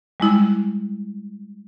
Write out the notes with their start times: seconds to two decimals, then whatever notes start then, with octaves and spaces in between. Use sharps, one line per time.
0.20 G3 G#3 E4 E6